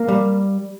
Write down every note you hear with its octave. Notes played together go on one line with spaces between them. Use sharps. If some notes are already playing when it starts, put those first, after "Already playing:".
Already playing: A#3
G3